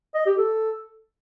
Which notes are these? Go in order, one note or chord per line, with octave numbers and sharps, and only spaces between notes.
D#5
G4
A4